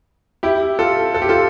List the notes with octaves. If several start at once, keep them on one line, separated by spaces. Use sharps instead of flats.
E4 G4
F4 A4
A4
G4
F4 A4